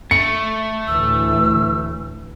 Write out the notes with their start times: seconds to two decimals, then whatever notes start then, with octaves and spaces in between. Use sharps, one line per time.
0.11 A3 C#7
0.88 D2 A2 E3 E6